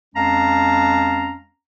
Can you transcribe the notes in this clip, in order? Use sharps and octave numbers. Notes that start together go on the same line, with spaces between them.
F2 G#3 C#4 F5 A5 A#5